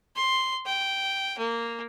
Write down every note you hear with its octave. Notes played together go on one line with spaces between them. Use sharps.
C6
G5
A#3